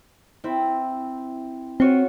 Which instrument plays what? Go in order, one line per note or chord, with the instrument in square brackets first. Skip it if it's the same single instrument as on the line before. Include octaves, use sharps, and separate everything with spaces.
[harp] C4 E4
[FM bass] C4 [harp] F4 F#4 C#5